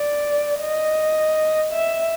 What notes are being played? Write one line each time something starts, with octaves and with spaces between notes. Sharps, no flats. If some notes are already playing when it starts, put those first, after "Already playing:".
Already playing: D5
D#5
E5